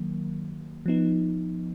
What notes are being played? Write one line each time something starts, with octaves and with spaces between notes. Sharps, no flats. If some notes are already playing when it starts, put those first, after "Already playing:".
Already playing: D#3 F#3 A#3
F3 B3 D#4